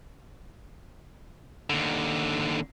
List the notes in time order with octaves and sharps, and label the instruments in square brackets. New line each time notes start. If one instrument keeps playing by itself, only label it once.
[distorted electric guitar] D#2 D3